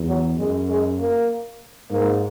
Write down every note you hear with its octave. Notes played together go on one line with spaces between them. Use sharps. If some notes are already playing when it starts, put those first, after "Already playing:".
Already playing: E2
F#3
F#2 G#3
G#3
A#3
G#2 A#3